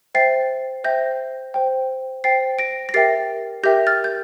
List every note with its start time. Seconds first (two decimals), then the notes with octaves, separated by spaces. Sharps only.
0.15 C5 E5 G5 A6 C7
0.84 C5 E5 G5 G6 A#6
1.54 C5 G5
2.24 C5 G5 A6 C7
2.59 A#6 D7
2.89 A#6
2.94 G4 A#4 E5 G5 A6 C7
3.63 G4 A#4 E5 G5 G6 A#6
3.87 F6 A6
4.04 G6